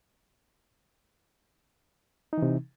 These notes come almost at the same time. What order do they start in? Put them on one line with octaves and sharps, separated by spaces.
D#4 E3 C3